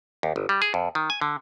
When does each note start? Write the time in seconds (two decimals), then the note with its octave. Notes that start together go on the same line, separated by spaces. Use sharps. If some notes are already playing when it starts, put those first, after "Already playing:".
0.23 D#2
0.36 G1
0.49 G3
0.62 G#4
0.74 F2
0.95 D#3
1.10 G#5
1.21 D3